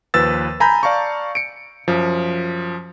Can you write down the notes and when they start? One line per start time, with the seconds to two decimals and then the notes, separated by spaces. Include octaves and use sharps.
0.14 D#2 F3 B4 E6 A6
0.60 G#5 A#5 B5 G6
0.83 D5 F5 A5 A#5 C#6
1.35 C#7 D7
1.88 F#2 F3